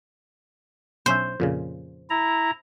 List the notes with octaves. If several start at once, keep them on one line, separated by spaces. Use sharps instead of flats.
B1 C#4 C5 E5
F2 A#2 C#3
E4 A#5